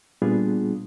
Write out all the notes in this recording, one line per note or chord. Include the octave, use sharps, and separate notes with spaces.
A#2 G3 B3 D4 F4 G#4